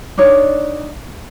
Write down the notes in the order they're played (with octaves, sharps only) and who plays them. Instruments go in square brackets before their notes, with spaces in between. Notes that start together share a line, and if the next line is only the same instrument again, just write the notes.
[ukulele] D4 D#4 C#5 D5